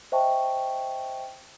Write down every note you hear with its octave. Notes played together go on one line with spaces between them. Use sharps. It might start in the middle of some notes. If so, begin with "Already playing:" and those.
C5 D#5 E5 G5 A5 C#6